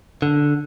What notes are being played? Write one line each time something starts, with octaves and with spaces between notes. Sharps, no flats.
D3